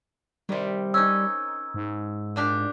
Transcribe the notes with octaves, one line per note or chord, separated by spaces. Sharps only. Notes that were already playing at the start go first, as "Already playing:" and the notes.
C3 D#3 G3
C#4 D#4 E6
G#2
A#2 D4 G4